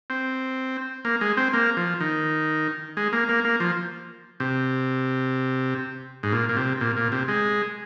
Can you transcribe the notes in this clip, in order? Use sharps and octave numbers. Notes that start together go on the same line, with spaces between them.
C4
A#3
G#3
C4
A#3
F3
D#3
G#3
A#3
A#3
A#3
F3
C3
G#2
A#2
A#2
C3
A#2
A#2
C3
G#3